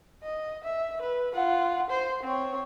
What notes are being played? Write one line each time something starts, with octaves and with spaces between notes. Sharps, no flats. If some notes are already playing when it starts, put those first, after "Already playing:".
D#5
E5
B4
F4 F#5
C5 C6
C4 C#5